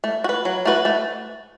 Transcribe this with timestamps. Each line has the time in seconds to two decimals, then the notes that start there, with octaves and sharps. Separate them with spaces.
0.04 A3
0.24 F#4
0.29 B4
0.45 F#3
0.65 A3 F#4 B4
0.85 A3